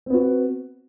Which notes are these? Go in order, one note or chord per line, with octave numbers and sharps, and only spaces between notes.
B3 C4 F#4